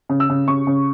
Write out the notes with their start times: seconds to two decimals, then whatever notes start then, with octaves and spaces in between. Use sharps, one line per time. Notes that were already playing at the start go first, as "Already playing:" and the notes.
0.09 C#3
0.20 E6
0.30 C#3
0.48 C#3 C#6
0.67 C#3